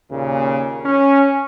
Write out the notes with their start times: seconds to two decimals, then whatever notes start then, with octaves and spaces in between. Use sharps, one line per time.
0.11 D#2 A#2 C#3
0.85 C#4